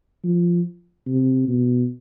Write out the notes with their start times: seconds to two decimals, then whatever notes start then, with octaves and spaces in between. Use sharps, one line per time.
0.24 F3
1.07 C3
1.48 B2